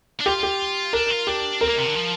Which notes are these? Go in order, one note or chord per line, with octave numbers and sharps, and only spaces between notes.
D4
F4 G4
G4
D4 A#4
F4
D4 G4
C4 A#4
A#3
C3
D3
F3